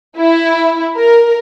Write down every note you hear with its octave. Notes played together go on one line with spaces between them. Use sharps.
E4
A#4